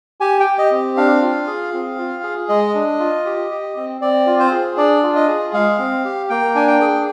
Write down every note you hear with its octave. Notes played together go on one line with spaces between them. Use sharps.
G4 G#5
G5
G4
D#5
C4
D4 F5
F4
G#4
C4
F4
G#4
G#3 D#5
D4
F4
G4
G4
C4
C4 D5
F4
C5
G#4
D4 D5
F4
D#5
G#4
G#3 F5
C4
G4
A#3 G5
D4 G#5
G5
G#4